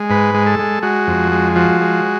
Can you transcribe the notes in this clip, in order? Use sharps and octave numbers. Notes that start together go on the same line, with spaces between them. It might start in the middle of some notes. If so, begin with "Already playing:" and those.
Already playing: G#3
G#2 B4
G#3
A4
G#3
G#3 F#4
F2
G#3
F3 F#4
G#3